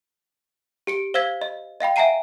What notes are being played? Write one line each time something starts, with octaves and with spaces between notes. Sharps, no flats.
G4 C#7 D7
C5 F5 E6 G#6 B6
D#5
D#5 F5 G5 B5
E5 F#5 G#5 A#5 C7 D#7